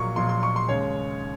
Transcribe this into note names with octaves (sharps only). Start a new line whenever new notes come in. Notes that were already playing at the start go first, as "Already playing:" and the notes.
Already playing: A#1 A#2 F#3 A#3 C#6
A#1 A#2 F#3 A#3 C6
C6
C#6
C6
D#2 C#3 G#3 C#5